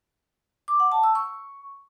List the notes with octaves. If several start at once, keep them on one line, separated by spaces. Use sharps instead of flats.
D6
F#5
A5
E6
C#6